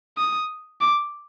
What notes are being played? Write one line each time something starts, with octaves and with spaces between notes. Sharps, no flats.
D#6
D6